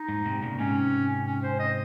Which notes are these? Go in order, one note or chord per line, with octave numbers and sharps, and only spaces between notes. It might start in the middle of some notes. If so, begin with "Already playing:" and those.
Already playing: D#4
G#2
G#2 C3
A#2 C#3
G#2 C3 C#4
C#4
C5
D#5